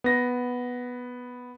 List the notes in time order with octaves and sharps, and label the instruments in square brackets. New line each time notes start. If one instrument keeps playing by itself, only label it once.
[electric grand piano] B3 A#6